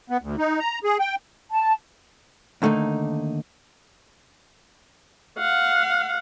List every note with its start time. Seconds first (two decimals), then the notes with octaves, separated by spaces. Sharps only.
0.10 B3
0.22 D2
0.38 D#4
0.60 A#5
0.84 G#4
1.00 G5
1.51 A5
2.62 D#2 D3 A3 A#3 D#4
5.39 F5 F#5